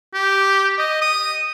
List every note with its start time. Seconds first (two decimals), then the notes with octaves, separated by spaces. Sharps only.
0.14 G4
0.78 D#5
1.01 D#6